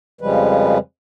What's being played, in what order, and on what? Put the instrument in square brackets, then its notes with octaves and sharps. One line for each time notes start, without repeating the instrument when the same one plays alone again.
[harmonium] F2 C#3 F3 G3 G#3 B4